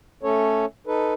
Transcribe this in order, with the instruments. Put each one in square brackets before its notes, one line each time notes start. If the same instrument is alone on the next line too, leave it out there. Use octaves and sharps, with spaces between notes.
[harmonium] A3 C#4 A4 C#5
D#4 A4 B4